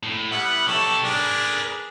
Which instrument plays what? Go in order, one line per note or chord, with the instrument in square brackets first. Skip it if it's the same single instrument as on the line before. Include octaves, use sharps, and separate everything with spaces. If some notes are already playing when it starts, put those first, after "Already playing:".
[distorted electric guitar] A2
[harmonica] G3 B3 E4 [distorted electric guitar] F#5
[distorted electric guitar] B1 A5 [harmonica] G4 A4 C#5
[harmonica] D4 G#4 [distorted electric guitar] A#4 B4